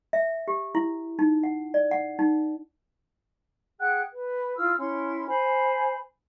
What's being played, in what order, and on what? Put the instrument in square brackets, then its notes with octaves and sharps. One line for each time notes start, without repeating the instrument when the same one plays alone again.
[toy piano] E5
G4
E4
D#4
F#5
D5
F#5
D#4
[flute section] G#4 F#5 G5 F#6
B4
E4 F4 E6 F6
C#4 E4 C6
C5 G#5 B5